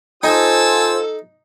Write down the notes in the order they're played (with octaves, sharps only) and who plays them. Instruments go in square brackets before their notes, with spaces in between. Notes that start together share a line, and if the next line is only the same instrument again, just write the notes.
[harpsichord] D#4 [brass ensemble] F4 C5 [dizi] A4 [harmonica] G#5 A5 E6